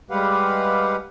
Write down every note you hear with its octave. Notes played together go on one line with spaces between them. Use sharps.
G3 G#3 G4 B4 F5 F#5